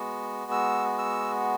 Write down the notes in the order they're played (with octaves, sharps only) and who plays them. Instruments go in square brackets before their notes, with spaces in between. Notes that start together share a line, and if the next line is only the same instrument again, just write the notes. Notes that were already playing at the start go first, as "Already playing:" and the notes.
Already playing: [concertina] G#3 B3 F#4
E6
E6